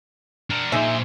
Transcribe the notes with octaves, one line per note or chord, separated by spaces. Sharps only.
D4 A#4
A#2 D#4 G#4 C5 E5